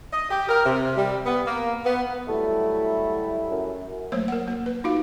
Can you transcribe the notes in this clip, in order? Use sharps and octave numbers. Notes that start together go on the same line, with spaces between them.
D#5
G4
A#4
C3
G3
B3
A#3
B3
F#3 G3 A3 E4
F#2
F#3 A3 A#3 C5 C#5
A#4 F#5
A#3
B4
D#4 F4 F#4 F5